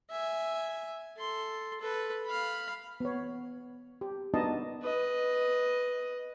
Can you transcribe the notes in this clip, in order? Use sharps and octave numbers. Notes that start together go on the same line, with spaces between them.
E5 G#5
A4 C6
A4 B4
F5 B5
B3 C#5
G4
B3 D4 D#4 F#4 D#5 A5
B4 D#5